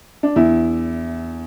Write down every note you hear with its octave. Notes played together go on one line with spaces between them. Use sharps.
D4
E2 E4